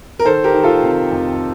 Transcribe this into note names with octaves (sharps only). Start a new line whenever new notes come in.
A#4
D#3 A4 C5
G4 A#4
D#3
F4 A4
C3
F2